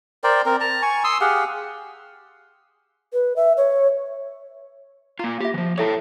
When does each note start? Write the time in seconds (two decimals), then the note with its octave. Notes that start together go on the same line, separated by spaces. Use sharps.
0.24 A#4 C5 D5 G5
0.46 C4 A#4
0.60 A5 A#5
0.82 G#5 C#6
1.04 C6 D#6 E6
1.21 G4 G#4 F5 F#5
3.13 B4
3.36 E5
3.57 C#5
5.19 A#3 F4 A#5
5.40 F4 G4 E5
5.54 E3 F3
5.78 E4 A4 C#5 E5 A5 D#6